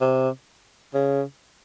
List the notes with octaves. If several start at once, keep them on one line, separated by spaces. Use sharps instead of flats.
C3
C#3